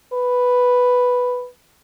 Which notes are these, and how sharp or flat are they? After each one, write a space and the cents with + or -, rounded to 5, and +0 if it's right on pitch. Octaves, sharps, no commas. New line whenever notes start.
B4 +0